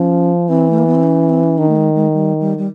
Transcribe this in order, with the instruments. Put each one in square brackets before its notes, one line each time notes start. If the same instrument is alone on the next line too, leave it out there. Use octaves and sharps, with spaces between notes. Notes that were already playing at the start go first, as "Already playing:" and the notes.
Already playing: [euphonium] F3 [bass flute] C#4
[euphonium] E3 [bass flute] C4
[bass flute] A3
A#3
B3
C4
C#4
C4
C#4
[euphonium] D#3 [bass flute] D4
[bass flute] A3
G#3
G#3
G3
G3
G3